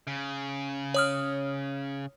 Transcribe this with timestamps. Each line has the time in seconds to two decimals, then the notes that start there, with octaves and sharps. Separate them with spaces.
0.07 C#3
0.94 C#5 D#6 F6